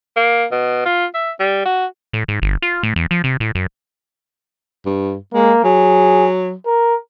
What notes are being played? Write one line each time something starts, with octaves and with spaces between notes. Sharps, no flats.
A#3
B2
F4
E5
G3
F#4
A2
G#2
G1
F4
A2
E2
F3
C3
A2
F#2
G2
G#3 A#3
F#3 G#4
A#4